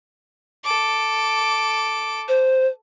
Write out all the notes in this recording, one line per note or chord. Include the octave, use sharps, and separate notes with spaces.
A4 D6
C5